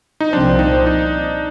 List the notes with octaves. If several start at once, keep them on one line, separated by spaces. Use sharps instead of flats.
D#4
C2 A#2 F3 C4 D4
D#4
D#4